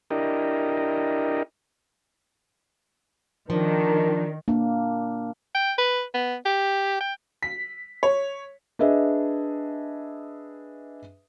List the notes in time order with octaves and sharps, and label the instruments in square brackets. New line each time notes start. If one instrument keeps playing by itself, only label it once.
[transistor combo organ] D4 E4 G4 A#4 D#5
[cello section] D#3 [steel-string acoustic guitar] F3 [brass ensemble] D4 A#4
[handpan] A#3 D4
[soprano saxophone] G5
B4
B3
G4
G5
[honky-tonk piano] B6
C#5
[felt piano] D4 G#4 B4 D#5 E5